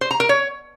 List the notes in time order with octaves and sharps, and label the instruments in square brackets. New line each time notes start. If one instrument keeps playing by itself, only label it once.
[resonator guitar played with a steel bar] C5
A#5
A#4
C#5